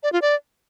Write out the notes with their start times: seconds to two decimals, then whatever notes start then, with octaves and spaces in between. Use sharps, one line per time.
0.03 D5
0.12 F4
0.22 D5